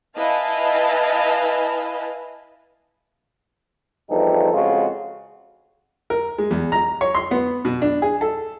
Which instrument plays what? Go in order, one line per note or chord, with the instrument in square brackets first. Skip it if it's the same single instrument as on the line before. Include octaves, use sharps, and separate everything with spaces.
[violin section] E4 B4 D#5 F5 G#5 A5
[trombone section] E2 G2 F3 D#4 G4 A4
F2 C#3 F3 G#3 F4 F#4
[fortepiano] A#4
G#3
E2
A#5
C#5
C6
B3
B2
D4
G#4
A4